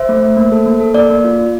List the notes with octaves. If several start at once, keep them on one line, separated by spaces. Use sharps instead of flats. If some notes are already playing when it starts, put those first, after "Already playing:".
Already playing: C5 E5
A3
A3
A#3
A4
A#3
A4
A#3 D5
A#3
F4
F4